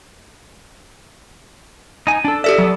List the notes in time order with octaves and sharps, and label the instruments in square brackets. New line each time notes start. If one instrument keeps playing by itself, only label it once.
[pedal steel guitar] D#4 G#5
D4 A4
[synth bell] G4 A4 D5 [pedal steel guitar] E5
[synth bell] F#3 [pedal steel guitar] B3 A4